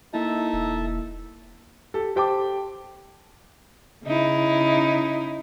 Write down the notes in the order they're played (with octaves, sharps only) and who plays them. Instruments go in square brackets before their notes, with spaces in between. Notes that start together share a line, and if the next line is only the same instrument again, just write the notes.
[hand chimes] A#3 E4 [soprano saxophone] D#4 [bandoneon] A4 E5 A5
[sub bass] E1
[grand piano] G4 A4
G4 C5 G5 A5 D6
[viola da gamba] C#3 D#4 E4